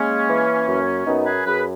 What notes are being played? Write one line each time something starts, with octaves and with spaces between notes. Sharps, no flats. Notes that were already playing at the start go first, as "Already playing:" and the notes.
Already playing: G#3 A#3 C#4
E3
F#2
F#2 B3 D#4
G#4 B4
F#2 G#4 B4